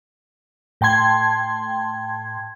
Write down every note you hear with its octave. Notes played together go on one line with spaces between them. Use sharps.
A2 G5 A5 C6 G#6